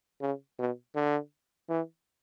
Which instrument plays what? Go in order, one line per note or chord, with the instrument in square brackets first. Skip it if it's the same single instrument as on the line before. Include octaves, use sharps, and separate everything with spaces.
[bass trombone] C#3
B2
D3
E3